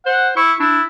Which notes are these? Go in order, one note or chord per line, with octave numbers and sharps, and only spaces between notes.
C5 F#5
E4 C#6
D4 E4